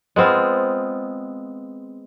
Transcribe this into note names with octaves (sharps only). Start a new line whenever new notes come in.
G#3 B3 C4 F4